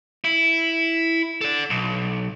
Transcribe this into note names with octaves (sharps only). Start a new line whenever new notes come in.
E4
A4 D5
B1